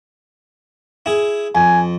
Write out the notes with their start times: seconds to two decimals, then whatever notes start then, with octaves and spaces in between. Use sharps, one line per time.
1.06 E4 G#4
1.55 F2 G#5